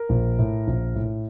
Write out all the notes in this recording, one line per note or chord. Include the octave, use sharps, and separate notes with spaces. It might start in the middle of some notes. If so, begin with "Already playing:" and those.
Already playing: A#4
A#1
A2
A#1
A2